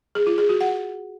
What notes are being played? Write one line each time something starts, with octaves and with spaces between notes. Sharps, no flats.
G#4
F4
G#4
F#4
F#5